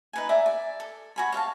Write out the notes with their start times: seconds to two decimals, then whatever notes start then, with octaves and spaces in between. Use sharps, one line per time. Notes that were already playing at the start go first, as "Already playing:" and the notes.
0.13 D#4 B4 G#5
0.29 D5 E5 G#5 A#5
0.46 D5
0.80 A4
1.16 F#4 G#5 B5
1.32 C#5 D5 F5 A5